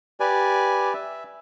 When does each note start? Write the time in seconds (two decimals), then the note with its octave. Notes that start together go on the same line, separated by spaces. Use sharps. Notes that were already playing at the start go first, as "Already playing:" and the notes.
0.20 G4 B4 D5 G#5
0.94 E5